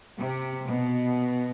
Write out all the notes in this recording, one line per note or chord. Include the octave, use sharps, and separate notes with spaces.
C3
B2